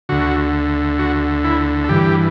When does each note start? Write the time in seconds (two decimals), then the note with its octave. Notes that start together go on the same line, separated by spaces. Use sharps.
0.09 D2 D3 F#4
0.99 F#4
1.44 E4
1.84 A4
1.89 G2 E3 G4